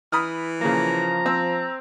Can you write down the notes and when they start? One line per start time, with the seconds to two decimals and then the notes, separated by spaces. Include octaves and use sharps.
0.12 E3 B5 D#6 F6
0.61 C#3 F3 A#3 A#5
1.26 C4 E6